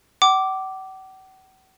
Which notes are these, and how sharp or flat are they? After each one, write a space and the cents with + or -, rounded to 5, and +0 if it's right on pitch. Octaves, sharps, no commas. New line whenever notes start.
F#5 +45 D6 +0